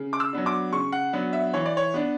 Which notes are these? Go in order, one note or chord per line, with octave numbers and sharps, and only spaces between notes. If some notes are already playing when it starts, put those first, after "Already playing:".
Already playing: C#3
D6
E6
F#3 B3 D4
D6
C#3 C#6
F#5
F#3 B3 D4
E5
E3 C#5
D5
C#5
B3 D4